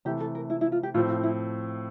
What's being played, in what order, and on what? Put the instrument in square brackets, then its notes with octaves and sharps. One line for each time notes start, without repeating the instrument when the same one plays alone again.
[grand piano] C3 E3 A3 [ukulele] G4
[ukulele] A4
A#4
E4
E4
F4
G4
[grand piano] A2 F3 C4 [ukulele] F4
[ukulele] F4
E4